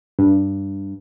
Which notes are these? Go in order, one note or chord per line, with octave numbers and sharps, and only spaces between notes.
G2